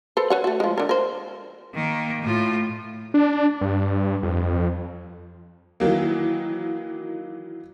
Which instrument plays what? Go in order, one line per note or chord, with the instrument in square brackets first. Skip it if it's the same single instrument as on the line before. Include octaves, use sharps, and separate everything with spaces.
[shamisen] A4 B4 C5
B4 C#5 F#5
A3 F#4
F3 G#3
D3 A#4
A#4 C5
[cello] D#3 A#3
A2 F4
[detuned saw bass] D4
G2
F2
[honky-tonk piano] D#3 E3 F#3 A#3